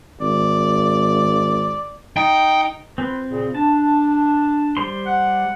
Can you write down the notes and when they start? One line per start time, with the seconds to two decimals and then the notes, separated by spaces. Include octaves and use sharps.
0.21 G#1 D5
2.17 D#4 G5
2.98 C4 F4 B4
3.28 A#2 C#3
3.55 D4 A5
4.77 G3 C5 C6
5.07 F#5